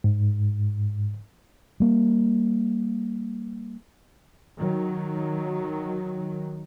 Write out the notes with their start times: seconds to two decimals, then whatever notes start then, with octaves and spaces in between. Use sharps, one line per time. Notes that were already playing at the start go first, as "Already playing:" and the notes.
0.04 G#2
1.80 G3 A#3
4.58 D#3 F#3